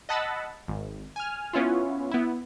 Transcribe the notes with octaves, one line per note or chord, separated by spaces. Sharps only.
D#5 F#5 A5 B5 E6 A6
G#1
G#5 F6
B3 C#4 E4 F4
B3 E4